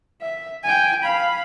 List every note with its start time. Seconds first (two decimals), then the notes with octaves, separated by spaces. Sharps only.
0.22 E5
0.64 G5 G#5
1.03 F5 B5